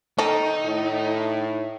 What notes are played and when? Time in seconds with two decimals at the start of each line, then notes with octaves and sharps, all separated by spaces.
0.18 D#3 D#4 A4 D#5
0.65 A2